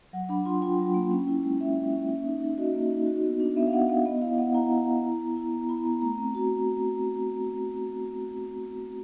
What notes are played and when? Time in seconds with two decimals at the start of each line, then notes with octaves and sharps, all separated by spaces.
0.13 F#3 F#5
0.29 D4 B5
0.45 F4 C6
0.61 F4 G5
0.79 F#3
0.94 A#3
1.11 C#4
1.28 E4
1.44 G#3
1.60 C#4 E5
1.77 G#3
1.93 C#4
2.09 A#3
2.25 D#4
2.42 D#4
2.58 F#4 D#5
2.75 A#3
2.91 D#4
3.07 F#4
3.24 B3
3.40 D4
3.56 B3 E5
3.67 F5
3.73 B3 F#5
3.89 B3 F5
4.05 B3 D#5
4.22 E4 F5
4.38 B3 F#5
4.54 E4 A#5
4.71 E4
4.87 E4
5.03 E4
5.19 B3
5.37 E4
5.52 B3 A#5
5.69 E4 B5
5.85 B3 A#5
6.01 A3 A#5
6.18 C4
6.35 F#4